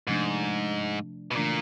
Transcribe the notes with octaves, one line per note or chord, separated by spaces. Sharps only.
G#2 C3 F3 A3 D4
B2
A#2 C#3 E3 A3 D4